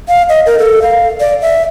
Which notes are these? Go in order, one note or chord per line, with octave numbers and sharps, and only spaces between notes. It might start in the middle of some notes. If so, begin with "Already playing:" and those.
F5
D#5
A#4
A4
F5
D5
E5